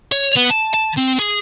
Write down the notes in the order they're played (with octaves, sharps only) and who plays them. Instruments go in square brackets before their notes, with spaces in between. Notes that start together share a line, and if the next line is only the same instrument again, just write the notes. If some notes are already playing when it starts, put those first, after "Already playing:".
[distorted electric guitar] C#5
B3
A5
A5
C4
G#4